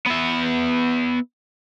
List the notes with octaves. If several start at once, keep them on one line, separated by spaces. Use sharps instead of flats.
B3 E5